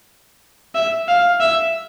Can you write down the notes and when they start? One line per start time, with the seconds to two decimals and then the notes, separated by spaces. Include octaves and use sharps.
0.75 E5
1.08 F5
1.41 E5